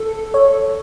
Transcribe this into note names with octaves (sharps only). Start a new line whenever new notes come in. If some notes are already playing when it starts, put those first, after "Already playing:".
Already playing: A4
C#5